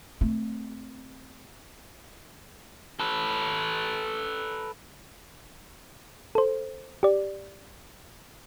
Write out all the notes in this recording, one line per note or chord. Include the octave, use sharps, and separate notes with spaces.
A3 C4
A4 B4
A4 C5
G4 D5